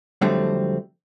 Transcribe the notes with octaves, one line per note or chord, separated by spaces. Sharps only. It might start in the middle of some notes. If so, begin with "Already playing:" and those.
F2 D3 F#3 G3 A3 C4